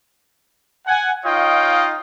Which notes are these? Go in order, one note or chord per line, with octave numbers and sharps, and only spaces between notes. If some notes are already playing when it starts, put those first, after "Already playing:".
F#5 G#5
D#4 F4 C#5 D#5 F5 G5